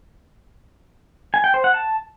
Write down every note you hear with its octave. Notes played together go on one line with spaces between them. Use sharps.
G#5
G5
C5
F#5
A5